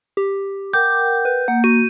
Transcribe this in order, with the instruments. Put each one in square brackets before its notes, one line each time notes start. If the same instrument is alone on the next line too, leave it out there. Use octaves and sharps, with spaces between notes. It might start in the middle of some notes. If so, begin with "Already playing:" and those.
[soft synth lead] G4
[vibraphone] A#4 F#5 G5 [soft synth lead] D6 [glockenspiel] G6
[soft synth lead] B4
[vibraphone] A#3 [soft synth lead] F#5
[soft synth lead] F#4 [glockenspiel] D#7